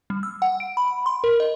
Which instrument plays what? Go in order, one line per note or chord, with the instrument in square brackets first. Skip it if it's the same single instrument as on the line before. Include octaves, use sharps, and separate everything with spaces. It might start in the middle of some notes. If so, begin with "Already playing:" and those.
[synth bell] G3
E6
F#5
D7
B5
C6
A#4
D#5